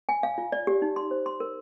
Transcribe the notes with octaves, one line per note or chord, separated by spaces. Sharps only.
G#5
F5
F4
D5
G4
D#4
C6
C5
C6
A#4